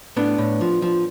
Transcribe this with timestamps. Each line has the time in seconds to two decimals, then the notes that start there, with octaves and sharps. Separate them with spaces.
0.16 A2 B3 D4
0.38 A2
0.61 F3
0.82 F3